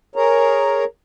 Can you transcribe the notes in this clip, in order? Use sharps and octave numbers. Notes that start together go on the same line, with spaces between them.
G#4 A#4 C#5 A#5